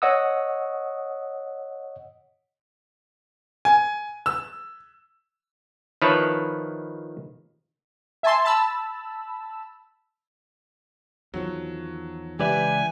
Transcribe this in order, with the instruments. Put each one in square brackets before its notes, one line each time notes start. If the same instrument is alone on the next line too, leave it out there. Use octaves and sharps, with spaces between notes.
[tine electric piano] C#5 D#5 F#5 D#6 E6
[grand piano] G#5
E6
[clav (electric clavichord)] D#3 F3 E4 B4 C#5 A5
[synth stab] E5 G#5 A5 C6
A5 B5 E6
[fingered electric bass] E2 D#3 F3 [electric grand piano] F#3
[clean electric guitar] C#2 E3 D5 [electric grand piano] G4 B4 E5 [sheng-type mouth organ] G#5